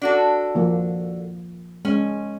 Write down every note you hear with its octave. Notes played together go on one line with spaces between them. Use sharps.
D4 F#4 A4
F3 A#3 F4
G#3 C#4